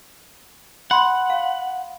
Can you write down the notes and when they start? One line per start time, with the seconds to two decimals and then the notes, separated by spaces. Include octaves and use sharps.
0.91 F#5 B5 C6
1.30 F5